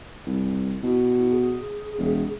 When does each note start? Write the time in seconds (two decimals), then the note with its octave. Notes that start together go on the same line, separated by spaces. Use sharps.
0.27 C2
0.83 B2 E4
1.31 G#4
1.98 E1